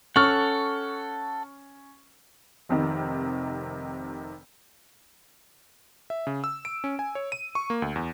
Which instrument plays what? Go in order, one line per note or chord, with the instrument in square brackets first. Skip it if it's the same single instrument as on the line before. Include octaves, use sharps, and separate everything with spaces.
[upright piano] C#4 F6 [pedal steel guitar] A4 F#5 [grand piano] C#6
[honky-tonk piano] F1 C3 D#3
[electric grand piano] E5
C#3
E6
D7
C#4
G#5
C#5
D#7
C#6
A#3
D2
E2